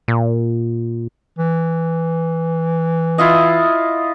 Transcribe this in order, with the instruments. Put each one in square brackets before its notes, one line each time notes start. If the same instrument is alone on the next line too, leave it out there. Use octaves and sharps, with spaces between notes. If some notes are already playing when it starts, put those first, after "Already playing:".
[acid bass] A#2
[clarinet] E3
[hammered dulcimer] E4 F4 D#5